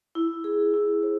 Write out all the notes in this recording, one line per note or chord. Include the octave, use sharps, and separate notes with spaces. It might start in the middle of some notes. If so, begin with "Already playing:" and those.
E4
G#4
E4
C5